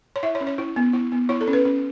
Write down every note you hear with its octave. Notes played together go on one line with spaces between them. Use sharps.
C#5
E4 E5
C#5
C#4
C#5
E4
B3
E4
B3
E4 C#5
A4
C#4
B4
C#4